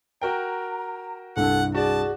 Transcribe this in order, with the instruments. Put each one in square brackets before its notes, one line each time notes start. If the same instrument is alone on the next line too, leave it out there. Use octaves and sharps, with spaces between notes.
[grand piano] F#4 A#4 G5 [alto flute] A#5
[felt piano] C2 G2 [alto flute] A4 [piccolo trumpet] F#5
[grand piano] F#4 D5 [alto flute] G#4 [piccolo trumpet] A5